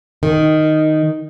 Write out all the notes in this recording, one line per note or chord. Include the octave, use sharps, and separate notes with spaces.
D#3